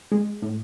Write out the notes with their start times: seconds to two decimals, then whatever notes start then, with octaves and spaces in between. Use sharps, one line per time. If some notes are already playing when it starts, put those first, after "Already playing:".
0.12 G#3
0.42 A2